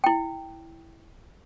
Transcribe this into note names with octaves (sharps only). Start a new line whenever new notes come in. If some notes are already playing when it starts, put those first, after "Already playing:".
E4 G5